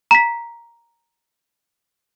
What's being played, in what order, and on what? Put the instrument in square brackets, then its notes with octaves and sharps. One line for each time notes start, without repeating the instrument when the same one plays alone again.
[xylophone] A#5 B6